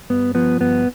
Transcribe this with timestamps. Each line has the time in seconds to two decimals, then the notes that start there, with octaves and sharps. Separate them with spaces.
0.10 G2 B3
0.35 F3 B3
0.60 G2 B3